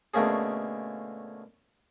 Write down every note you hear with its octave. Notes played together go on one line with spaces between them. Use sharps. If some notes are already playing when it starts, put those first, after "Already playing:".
B2 D3 A3 A#3 C#4 G#4